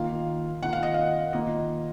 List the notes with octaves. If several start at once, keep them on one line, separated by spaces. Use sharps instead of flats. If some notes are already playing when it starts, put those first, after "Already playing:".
Already playing: D#3 A#3 F4 F5
D#3 A#3 F4 F#5
F5
D#5
F5
D#3 A#3 F4 D#5